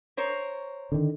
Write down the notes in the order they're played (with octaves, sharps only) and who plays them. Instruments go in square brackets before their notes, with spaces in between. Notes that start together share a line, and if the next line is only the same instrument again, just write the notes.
[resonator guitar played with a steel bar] A#4 C5 C#5
[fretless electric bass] D3 D#3